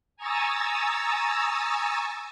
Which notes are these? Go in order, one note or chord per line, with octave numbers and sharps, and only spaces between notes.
G#5 A#5 C#6 D#6 E6 A6